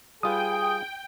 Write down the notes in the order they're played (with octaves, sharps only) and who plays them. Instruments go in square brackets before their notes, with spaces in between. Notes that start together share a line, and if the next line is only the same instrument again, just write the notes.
[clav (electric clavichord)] G3 F4 B4 [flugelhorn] G#4 [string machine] G5 [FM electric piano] D#6